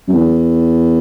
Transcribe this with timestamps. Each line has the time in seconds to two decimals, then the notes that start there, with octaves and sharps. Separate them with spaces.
0.08 F#2
0.14 E2